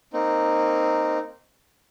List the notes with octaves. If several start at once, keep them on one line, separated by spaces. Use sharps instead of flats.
A#3 C4 D#4